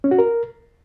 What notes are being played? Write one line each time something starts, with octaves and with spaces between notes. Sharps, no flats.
C#4
F#4
A#4